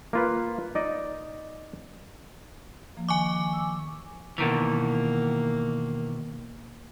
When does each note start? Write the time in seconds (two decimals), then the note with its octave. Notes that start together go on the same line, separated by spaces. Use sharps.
0.13 A#3 F4 B4
0.75 D#4 D5 D#5
2.97 F3 A#3
3.09 D#3 G#5 C#6 D6
3.53 E6
4.38 B2 D#3 E3 A#3